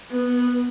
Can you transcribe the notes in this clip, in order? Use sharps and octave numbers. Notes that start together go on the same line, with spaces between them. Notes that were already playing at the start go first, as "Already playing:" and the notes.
B3